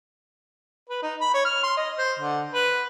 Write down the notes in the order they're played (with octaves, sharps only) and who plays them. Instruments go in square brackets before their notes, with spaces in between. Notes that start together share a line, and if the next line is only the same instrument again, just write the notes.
[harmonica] B4
D#4
B5
C#5
F6
C6
D#5
C5
D3
B4